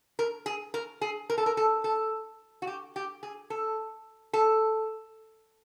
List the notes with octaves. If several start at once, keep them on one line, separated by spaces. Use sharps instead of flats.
A#4
G#4
A#4
G#4
A#4
A4
A#4
A4
A4
F#4
G4
G4
G#4
A4
A4